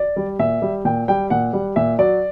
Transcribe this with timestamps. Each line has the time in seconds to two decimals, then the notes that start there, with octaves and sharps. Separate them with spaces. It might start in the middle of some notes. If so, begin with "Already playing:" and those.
Already playing: D5
0.16 G3
0.39 A#2 E5
0.62 G3
0.85 A#2 G5
1.08 G3 G5
1.30 A#2 F#5
1.53 G3
1.76 A#2 E5
1.99 F#3 D5